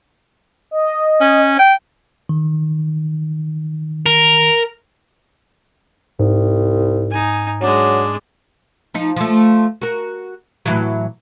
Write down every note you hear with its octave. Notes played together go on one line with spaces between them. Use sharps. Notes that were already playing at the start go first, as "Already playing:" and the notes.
D#5
C#4
G5
D#3
A#4
C2 G#2
D#4 G#5
F#3 G#3 D4
F3 D#4
F3 A3
F#4 A#4
A2 E3 F#3